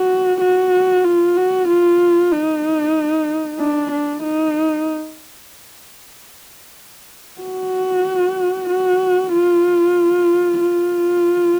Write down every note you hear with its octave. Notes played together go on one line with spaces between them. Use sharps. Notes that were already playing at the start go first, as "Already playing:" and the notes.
Already playing: F#4
F#4
F4
F#4
F4
D#4
D4
D4
D#4
F#4
F#4
F4
F4